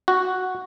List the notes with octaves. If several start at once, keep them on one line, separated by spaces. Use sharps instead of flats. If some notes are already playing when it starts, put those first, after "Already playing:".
F#4